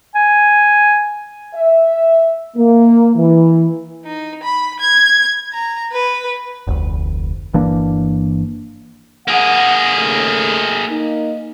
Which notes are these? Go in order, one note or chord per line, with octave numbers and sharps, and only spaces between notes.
G#5
E5
A#3
E3
D#4
B5
G#6
A#5
B4
F1 D2
G1 E3 A#3 D4
A#3 G#4 F#5
D#2 C#3 A3
A#3 D#4